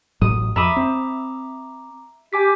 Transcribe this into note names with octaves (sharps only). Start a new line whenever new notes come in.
A1 A2 F#3 D#6
F2 E5 A#5 B5 D6 D#6
C4
G4 G#5 D6 B6